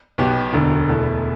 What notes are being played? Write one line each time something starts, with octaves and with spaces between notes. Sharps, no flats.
B1 B2 B3 G4
E1 D2 D3
E2 B2 A3